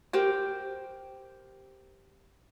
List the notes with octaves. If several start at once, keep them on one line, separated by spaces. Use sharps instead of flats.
G4 A#4 C5 G5